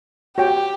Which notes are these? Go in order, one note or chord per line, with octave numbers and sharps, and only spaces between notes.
F#4 G4 C#5 G5